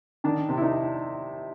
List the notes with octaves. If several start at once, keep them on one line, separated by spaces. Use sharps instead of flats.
D#3 D4
C3
E4
D#4